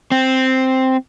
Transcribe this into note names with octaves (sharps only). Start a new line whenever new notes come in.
C4